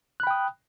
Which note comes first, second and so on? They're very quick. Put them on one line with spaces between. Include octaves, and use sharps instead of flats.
F#6 B5 G5 D#6